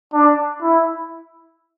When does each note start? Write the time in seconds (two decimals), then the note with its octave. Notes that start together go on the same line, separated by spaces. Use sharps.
0.13 D4
0.62 E4